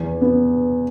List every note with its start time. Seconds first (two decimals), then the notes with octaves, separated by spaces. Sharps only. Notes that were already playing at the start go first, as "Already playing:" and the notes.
Already playing: E2
0.21 B3